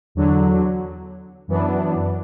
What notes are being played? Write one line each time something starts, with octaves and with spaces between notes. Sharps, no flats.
E2 D3 F#3
F#2 E3 B3 D4